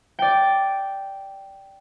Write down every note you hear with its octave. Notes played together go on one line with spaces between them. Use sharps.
D5 G5